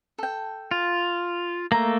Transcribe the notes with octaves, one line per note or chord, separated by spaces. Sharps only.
A4 G5
F4
A3 A#3 A#5